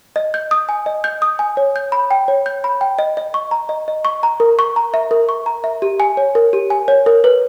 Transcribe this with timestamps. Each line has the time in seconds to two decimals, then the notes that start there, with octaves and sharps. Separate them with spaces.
0.16 D#5
0.34 G6
0.51 D#6
0.69 G#5
0.86 D#5
1.04 G6
1.22 D#6
1.39 G#5
1.57 C#5
1.76 G6
1.92 B5
2.11 G5
2.28 C#5
2.46 G6
2.64 B5
2.81 G5
2.99 D#5
3.17 D#5
3.34 C#6
3.51 A#5
3.69 D#5
3.88 D#5
4.05 C#6
4.23 A#5
4.40 A#4
4.59 C#6
4.76 A#5
4.94 E5
5.11 A#4
5.29 C#6
5.46 A#5
5.64 E5
5.82 G4
6.00 G#5
6.17 C#5
6.35 A#4
6.53 G4
6.70 G#5
6.88 C#5
7.06 A#4
7.24 B4